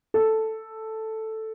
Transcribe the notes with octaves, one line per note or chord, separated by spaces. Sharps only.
A4